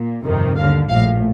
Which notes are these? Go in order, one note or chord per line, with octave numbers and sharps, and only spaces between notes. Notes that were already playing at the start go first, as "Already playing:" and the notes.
Already playing: A#2
G1 F2 C3 D#3
D#2 D3 F5
A#1 A2 F5